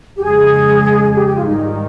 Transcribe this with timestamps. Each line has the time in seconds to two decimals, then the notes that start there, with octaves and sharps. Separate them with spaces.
0.17 G4
0.21 F2 C#3 G#3 G#4
1.15 G4
1.26 G4
1.36 F4
1.45 G#2 D#3 G3 D#4